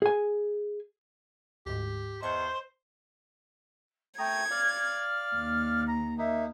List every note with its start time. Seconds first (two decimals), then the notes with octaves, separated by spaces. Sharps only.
0.02 G#4 G#5
1.66 D2 G#2 G4
2.22 E2 C5 D#5 C#6 C7
4.18 A3 G5 A#5 D#6 G#6
4.50 D5 F5 F6
5.35 D#2
5.87 A#5
6.18 A#3 D#4 E5